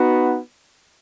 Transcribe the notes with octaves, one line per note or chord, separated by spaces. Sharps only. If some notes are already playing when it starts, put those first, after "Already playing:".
Already playing: B3 D#4 F#4